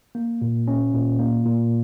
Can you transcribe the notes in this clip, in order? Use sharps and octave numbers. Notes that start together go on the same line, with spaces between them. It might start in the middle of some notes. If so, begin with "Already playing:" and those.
A#3
A#2
C#4
A#2
A#3
A#2